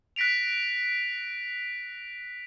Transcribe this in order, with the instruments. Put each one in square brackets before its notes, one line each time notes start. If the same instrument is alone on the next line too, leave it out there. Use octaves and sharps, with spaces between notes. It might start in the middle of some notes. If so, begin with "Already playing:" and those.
[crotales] F#6 A#6 B6 D7 F7